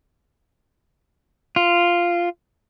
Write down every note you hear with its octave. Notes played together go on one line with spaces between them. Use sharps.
F4